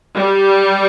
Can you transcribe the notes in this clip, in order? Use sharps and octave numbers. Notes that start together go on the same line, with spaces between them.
G3